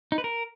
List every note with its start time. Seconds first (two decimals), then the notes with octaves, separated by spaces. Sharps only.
0.12 D#4
0.18 B4
0.24 A#4